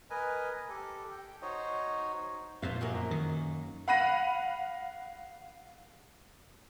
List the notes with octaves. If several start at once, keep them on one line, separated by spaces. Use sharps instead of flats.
A#4 B4 D#5 G#5
G4 A4
G5
D#4 F#4 C5 C#5 D#5
F2 A#2 C5 F5
F#2 F#3 A#3
D#3
F5 F#5 B5 F#6 A#6 D#7